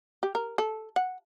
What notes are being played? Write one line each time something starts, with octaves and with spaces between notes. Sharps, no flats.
G4
A#4
A4
F#5